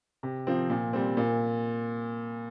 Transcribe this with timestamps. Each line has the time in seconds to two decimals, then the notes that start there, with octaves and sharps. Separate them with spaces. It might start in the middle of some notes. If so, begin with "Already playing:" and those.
0.23 C3
0.47 F3 C4
0.70 A#2
0.93 G3 C4
1.17 A#2